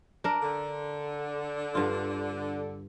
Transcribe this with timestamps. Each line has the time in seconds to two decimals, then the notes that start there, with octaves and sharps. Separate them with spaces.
0.24 D4 A#4
0.42 D3
1.75 G2 F4